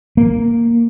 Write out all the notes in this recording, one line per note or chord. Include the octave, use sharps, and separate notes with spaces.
A#3